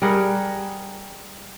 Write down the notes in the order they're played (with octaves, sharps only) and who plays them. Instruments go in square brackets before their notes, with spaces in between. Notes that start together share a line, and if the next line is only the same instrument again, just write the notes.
[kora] G3 G#4 A#4 F#5